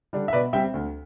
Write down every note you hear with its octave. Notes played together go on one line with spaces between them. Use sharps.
D3 G3 D4
E5
B2 B4 D5
G3 C4 E5 G5
D2